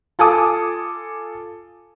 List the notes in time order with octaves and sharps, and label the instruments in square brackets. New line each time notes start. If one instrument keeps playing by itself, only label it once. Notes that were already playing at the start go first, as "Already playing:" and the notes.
[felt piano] F4 A4 G#5 D6 D#6